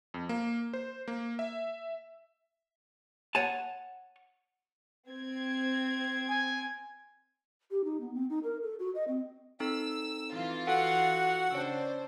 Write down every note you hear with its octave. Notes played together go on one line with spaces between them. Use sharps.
F2
A#3
C5
A#3
E5
C#5 F#5 G#5 A5
C4 G#6
G#5
G4
D#4
B3
C4
D#4
A#4
A4
F#4
D#5
C4
C4 D#4 A4 E6
E3 F4
F#4 A4 F#5 G#5
C#3 D4 C5 C#5 G5 E6